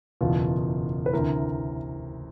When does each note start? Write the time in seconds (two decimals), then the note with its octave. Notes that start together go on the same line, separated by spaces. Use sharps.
0.21 F#1 E2 B2 F4
1.06 B4
1.13 D2 C3 E3 A#4